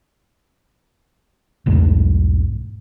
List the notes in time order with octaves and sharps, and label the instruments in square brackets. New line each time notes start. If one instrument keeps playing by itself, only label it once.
[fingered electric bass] B1 E2 G#2 A3